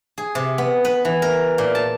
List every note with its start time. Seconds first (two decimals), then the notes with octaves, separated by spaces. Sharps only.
0.18 G#4
0.35 C3
0.58 B3
0.85 B4
1.05 E3
1.22 A#4
1.58 A#2
1.75 A5